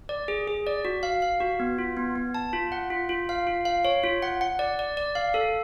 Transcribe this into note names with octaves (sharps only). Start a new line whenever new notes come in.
D5
G#4
G#4
D5
F#4
F5
F5
F#4
B3
F4
B3
B3
A5
F4
F#5
F4
F4
F5
F4
F5
C#5
F4
F#5
F#5
D5
D5
D5
F5
A4